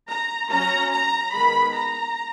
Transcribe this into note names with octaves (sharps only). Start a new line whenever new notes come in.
A#5
F#3 C#4 A#5
A#5
D#3 G#3 B3 B5
A#5